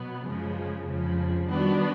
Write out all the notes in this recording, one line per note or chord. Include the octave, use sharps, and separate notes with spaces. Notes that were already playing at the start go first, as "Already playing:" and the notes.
Already playing: B2 F#3 B3
F#2 C#3 F3 G#3
F2 C#3 F3
D#3 G3 B3 D4 F#4